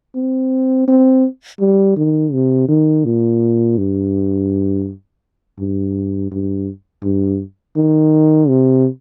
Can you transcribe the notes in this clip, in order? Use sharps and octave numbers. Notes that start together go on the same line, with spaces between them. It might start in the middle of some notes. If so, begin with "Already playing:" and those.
C4
C4
G3
D#3
C3
D#3
A#2
G2
G2
G2
G2
D#3
C3